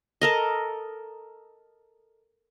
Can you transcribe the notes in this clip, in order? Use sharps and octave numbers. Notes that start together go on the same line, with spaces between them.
A4 A#4 D#5